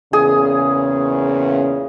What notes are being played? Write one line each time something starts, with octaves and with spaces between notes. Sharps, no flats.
E2 A#2 C#3 G#4